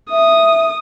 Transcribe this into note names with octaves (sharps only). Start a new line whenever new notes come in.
E5 D#6